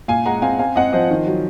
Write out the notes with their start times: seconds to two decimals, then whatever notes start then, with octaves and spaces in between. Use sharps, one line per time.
0.08 A#2 F5 G#5
0.26 G#3 F#5 A#5
0.42 C4 F5 G#5
0.59 C4 F5 G#5
0.76 C4 D#5 F#5
0.93 F3 C5 D#5
1.11 D#3
1.27 F#3